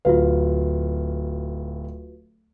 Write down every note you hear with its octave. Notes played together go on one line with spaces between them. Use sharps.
D1 F4 F#4 B4 F5